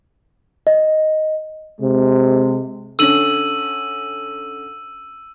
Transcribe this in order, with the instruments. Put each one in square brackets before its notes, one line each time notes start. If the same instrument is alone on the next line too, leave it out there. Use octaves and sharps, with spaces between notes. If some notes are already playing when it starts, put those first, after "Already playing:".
[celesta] D#5
[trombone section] C3 G#3
[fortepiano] D3 C#4 [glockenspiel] E6 D#7 F#7